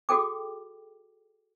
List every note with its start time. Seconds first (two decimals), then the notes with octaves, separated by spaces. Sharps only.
0.09 F#4 G#4 A4 G5 D6